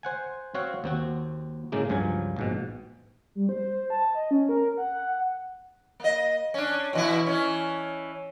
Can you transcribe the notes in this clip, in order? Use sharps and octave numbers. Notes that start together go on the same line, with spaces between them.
C5 F#5 G#5
C4 F#4 C#5 F5 F#5
D#2 C4 F#4
A2 C#3 G#3 A#3
C#2 G2 F3 F#3 G#5
A#1 G#2 B2
G3
C5
A5
D#5
C#4
A#4
F#5
A#3 D#5
C#4 D4
B2 E3 E4
E3 C#4